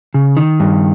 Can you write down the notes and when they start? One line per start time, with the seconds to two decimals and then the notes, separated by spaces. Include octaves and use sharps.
0.14 C#3
0.37 D#3
0.60 G2